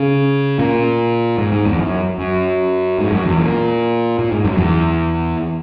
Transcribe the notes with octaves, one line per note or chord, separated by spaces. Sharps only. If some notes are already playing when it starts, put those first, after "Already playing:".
Already playing: C#3
A#2
G#2
G#2
E2
F#2
F#2
G#2
F#2
E2
A#2
A#2
G#2
F#2
E2